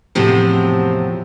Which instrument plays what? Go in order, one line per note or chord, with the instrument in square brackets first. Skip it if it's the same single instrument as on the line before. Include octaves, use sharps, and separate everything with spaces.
[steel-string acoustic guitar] E2 A2 C3 F3 F#3 C4